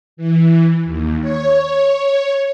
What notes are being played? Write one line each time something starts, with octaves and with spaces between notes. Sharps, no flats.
E3
D#2
C#5